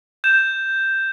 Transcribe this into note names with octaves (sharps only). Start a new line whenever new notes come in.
G6 E7